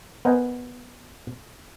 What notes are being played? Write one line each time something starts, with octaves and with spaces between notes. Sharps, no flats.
B3 A#4 C5 D#5 F#5 G#5